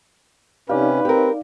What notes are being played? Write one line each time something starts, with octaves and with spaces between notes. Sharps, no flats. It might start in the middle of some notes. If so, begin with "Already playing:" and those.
C3 C#4 D#4 G4 B4 D5 F5
C4 G4 A#4